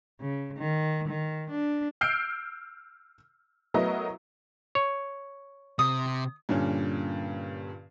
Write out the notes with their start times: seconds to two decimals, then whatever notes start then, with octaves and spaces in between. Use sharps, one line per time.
0.21 C#3
0.57 D#3
1.08 D#3
1.51 D4
2.01 E6 F6 G6 C7 D7
3.74 F#3 A3 B3 E4 A#4 D#5
4.75 C#5
5.79 C3 D#6
6.49 G2 A#2 D3 C#4